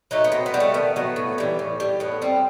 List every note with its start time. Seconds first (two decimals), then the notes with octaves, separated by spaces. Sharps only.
0.11 F#3 A3 D#4
0.24 B3
0.32 B2 C4
0.46 B3
0.54 G3
0.60 A3
0.74 D#3 B3
0.96 F#3 A3 B3
1.16 A2
1.38 E3 G3
1.59 A2
1.80 G3
2.00 A2 B3
2.22 G3 C4